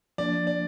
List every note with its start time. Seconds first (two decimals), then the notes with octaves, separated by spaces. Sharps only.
0.18 F3 A#3 D4 D5
0.47 D5